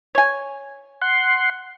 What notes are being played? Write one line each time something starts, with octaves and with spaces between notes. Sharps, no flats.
C#5 G#5
F#5 C6